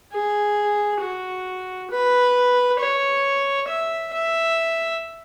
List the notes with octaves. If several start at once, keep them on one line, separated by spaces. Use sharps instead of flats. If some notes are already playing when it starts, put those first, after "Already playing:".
G#4
F#4
B4
C#5
E5
E5